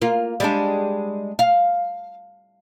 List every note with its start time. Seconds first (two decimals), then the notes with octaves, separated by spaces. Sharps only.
0.02 A#3 F4
0.40 G3 G#3 D4
1.39 F5